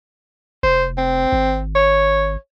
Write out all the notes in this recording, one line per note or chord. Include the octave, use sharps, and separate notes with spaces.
F1 C5
C4
G#1
C#5